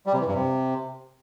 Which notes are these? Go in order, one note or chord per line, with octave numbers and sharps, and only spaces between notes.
G3
C3
E3
G2
C3